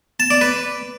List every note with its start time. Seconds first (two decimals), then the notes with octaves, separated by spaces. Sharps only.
0.20 A5
0.30 D5
0.41 B4